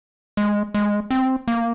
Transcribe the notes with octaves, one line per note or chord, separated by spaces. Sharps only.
G#3
G#3
C4
A#3